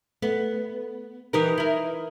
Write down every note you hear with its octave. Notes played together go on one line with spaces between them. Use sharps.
A3 B3
E3 D#4 G4 A#4 B4 D#6
E4 A#4